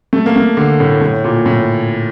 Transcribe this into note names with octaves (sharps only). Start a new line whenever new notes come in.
A3
A#3
A3
D3
A2
A2
A#2
A2